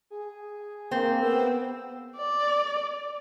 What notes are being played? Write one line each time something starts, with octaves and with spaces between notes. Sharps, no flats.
G#4
A#3 C4
B3 E6
D5